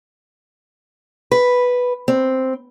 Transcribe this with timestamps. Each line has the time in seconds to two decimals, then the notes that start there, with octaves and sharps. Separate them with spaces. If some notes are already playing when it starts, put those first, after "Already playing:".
1.31 B4
2.08 C4